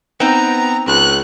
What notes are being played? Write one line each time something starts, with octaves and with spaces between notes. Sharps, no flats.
B3 C4 D#4 A#5
C#2 F#6